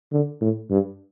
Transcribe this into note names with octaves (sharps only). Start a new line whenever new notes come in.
D3
A2
G2